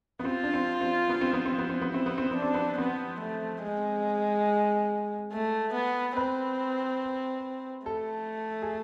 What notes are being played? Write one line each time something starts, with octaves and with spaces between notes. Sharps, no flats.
B3
C4 F4
D4
C4
C4
B3
C4
B3
C4
B3
C4
B3
C4 E4
B3
C4
B3 D4
C4
B3
B3 C4
A3
G#3
A3
B3
C4 B4
A3 A4
G#4